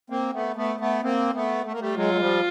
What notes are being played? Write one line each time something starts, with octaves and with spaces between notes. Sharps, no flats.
A#3 C4
A3 B3
A3 B3
A3 B3
A#3 C4
A3 B3
A3
A#3
G3 A3
F#3 G#3 F4
G#3
F3 G3